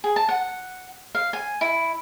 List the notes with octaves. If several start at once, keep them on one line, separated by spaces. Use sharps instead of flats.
G#4
A5
F#5
F5
G#5
E4